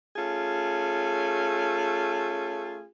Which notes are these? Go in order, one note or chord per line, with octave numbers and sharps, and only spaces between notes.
A3 C#4 F4 G#4